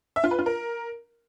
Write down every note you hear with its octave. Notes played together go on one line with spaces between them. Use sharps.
E5
F4
B4
F4
A#4